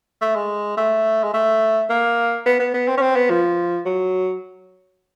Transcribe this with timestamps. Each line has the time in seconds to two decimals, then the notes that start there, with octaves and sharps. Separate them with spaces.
0.22 A3
0.35 G#3
0.77 A3
1.24 G#3
1.34 A3
1.90 A#3
2.46 B3
2.60 B3
2.74 B3
2.88 C4
2.97 C#4
3.02 C4
3.16 B3
3.30 F3
3.86 F#3